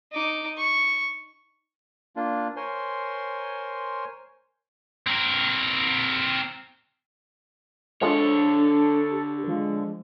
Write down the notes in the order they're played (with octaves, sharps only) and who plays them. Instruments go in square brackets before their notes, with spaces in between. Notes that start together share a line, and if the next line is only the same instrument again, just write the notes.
[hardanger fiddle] D#4 D6
C#6
[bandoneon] A#3 D4 F4
A#4 C5 C#5 G#5 C6
[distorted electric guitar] C4 A#4
[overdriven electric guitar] D3 C#5 [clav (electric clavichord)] F3 G#3 [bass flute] D4 [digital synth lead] A4
[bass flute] G4
[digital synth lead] F3 [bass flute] G#3